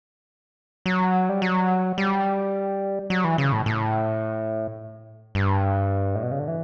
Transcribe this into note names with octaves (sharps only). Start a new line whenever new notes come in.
F#3
G3
F#3
G3
F#3
E3
C#3
A2
A2
G2
A2
B2
C#3
D3
E3